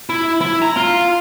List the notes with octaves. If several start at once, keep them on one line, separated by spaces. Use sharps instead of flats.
E4
E4
A#5
F4